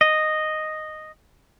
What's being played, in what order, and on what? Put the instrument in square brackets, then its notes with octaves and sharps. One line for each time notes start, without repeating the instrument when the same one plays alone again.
[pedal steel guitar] D#5